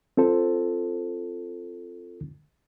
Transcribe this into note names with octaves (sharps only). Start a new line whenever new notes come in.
C4 F4 A4 C5